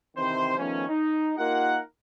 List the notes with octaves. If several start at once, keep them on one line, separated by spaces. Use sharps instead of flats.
C3 D#3 E3 C4 C5
D#3 F3 A3 B3 C#4
D#4
A#3 D#4 F4 G4 A#4 F#5